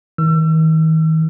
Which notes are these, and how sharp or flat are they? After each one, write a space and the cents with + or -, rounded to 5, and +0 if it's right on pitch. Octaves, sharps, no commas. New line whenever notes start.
D#3 +40 E6 +35